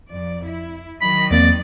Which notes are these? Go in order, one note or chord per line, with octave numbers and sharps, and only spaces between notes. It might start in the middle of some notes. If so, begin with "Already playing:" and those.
F2 D5
E4
D#3 F#3 D#5 B5
E2 A#3 C4 D5